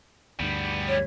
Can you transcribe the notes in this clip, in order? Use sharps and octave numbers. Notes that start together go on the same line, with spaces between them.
D2 G2 G3 B3
C#5